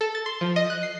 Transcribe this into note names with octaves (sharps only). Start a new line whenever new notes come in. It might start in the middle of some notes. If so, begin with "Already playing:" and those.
A4
A6
C6
F3
D#5
F#6
C7